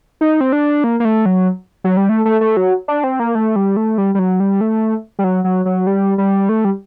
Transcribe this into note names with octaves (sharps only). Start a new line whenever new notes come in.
D#4
C4
D4
A#3
A#3
A3
F#3
F#3
G3
A3
A3
A3
F#3
D4
C4
A#3
A3
G3
A3
G3
G3
F#3
G3
A3
G3
F#3
F#3
F#3
G3
G3
A3
G3